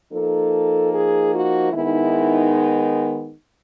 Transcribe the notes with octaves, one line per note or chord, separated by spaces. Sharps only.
F3 A#3 D#4 A4
G#4
F#4
D#3 G#3 B3 D#4 E4